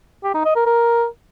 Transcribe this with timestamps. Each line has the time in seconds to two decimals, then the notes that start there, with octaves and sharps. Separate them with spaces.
0.24 G4
0.34 D#4
0.45 D#5
0.55 A#4
0.66 A#4